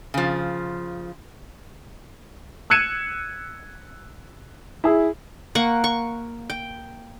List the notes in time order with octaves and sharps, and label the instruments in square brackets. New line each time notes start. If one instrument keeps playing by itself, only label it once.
[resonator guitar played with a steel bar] C#3 F3
[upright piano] E6 F#6 G#6 C#7 D#7 E7
E4 G#4
[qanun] A#3 F#5 C#6
C#6
G5